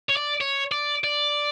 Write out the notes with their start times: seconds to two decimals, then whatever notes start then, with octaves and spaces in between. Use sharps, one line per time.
0.10 C#5
0.17 D5
0.41 C#5
0.72 D5
1.04 D5